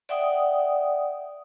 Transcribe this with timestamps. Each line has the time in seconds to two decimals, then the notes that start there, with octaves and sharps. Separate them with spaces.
0.09 D5 E5 F#5 G5 D#6